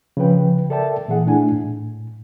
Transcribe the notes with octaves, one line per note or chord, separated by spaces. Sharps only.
C#3 F3 B4 G5
A4 A#4 D5 E5 G5 A5
A#2 E3 G#4 F#5
A3 D4 E4 G#5
A2